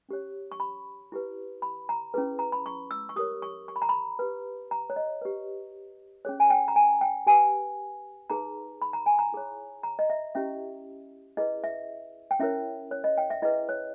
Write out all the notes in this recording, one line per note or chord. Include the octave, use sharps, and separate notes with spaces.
C#4 G4 C#5
C#6
B5
E4 G4 B4
B5
A#5
C#4 E4 G#4 B4
A#5
B5
C#6
E6
C#6
G4 A#4 C#5 D#6
C#6
C#6
B5
A#5
B5
G4 B4
A#5
C#5
D#5
G4 B4
C#4 G#4 C#5
G#5
G5
A#5
G#5
G5
G4 B4 G#5
D#4 G#4 B4 A#5
B5
A#5
G#5
A#5
E4 G#4 C#5
A#5
D#5
E5
C#4 E4 G4 E5
E4 G#4 B4 D#5
E5
G5
C#4 E4 A#4 C#5 E5
C#5
D#5
G5
E5
E4 G#4 B4 D#5
C#5